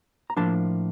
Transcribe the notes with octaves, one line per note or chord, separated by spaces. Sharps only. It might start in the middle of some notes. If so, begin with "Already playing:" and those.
A#5
A2 F3 A#3 D4 A5